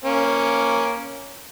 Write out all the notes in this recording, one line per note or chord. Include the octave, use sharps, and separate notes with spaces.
A#3 C#4